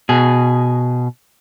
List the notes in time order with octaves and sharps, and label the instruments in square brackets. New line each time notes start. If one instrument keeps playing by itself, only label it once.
[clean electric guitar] B2 G#4